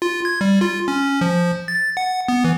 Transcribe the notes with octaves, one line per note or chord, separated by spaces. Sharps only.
F4
G#6
G3
F4
C#4
F3
A6
F#5
B3
E3